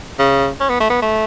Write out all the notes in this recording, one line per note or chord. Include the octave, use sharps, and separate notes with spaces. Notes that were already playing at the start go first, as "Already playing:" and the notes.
C#3
C#4
B3
A3
B3
A3